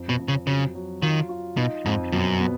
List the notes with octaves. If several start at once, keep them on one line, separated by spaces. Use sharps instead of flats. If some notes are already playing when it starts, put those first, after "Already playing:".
Already playing: F2
B2
F2
C#3
C#3 F#3
F#3
D#3 F4
F4
B2 D#4
F2 G#2
F#2 B2
B3